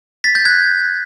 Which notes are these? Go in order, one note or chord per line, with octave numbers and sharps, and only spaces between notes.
A6 B6
G6 A6
F#6 G#6